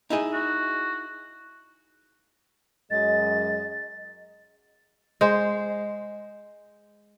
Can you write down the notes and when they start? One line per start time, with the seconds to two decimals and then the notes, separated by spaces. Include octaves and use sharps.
0.10 D#4 E4 G#4
0.33 F#4
2.91 F#2 F#3 G#3 D#5 A6
5.21 G#3 C5